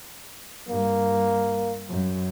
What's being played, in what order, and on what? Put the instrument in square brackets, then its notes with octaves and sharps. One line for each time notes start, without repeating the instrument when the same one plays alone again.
[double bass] G2 [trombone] A#3
[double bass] F#2